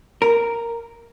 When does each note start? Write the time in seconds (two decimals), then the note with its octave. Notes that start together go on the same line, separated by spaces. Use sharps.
0.22 A#4